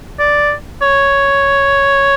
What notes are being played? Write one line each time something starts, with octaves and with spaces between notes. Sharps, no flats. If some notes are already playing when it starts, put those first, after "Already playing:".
D5
C#5